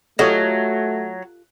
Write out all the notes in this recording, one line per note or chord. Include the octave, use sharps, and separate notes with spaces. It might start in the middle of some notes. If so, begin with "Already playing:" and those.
F#3 A3 F4 G4 A4 C#5 D#5